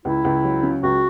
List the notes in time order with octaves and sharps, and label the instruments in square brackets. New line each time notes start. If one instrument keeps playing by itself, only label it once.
[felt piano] C#2 [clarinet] E4
[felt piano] C#2
F#3
C#3
[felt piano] C#2 [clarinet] F#4